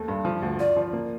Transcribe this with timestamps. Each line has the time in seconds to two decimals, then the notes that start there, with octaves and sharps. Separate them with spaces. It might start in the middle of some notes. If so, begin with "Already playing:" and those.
Already playing: D#2 A3
0.08 G2
0.25 F3
0.42 D2
0.59 F4 D5
0.77 F3
0.93 A#3